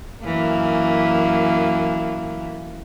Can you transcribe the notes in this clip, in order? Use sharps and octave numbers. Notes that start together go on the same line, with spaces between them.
F#2 E3 A#3